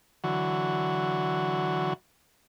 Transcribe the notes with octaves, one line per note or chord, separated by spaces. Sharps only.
D3 E3 F#3 F#4